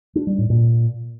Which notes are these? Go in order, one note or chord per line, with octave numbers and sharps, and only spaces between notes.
D4
G3
A2
A#2